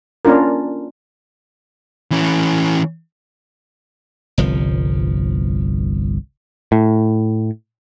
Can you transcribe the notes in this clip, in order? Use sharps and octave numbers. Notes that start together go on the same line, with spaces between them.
A#3 C#4 D4 F4 A#4
E3 C#4
G1 C2 F3
A2